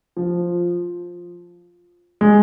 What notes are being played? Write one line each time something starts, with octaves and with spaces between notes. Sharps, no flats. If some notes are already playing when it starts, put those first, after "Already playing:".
F3
G#3